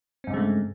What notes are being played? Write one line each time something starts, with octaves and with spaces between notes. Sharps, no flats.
G2 C#3 G#3 A3 C4